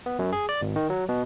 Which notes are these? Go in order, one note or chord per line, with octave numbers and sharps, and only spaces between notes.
B3
F#2
G#4
D5
G#1
D#3
F#3
B2